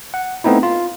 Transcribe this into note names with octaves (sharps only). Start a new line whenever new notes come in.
F#5
A3 B3 C4 D#4 E4
F4